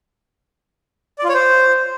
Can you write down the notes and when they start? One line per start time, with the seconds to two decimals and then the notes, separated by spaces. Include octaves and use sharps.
1.19 D5
1.24 F4
1.29 C#5
1.34 C5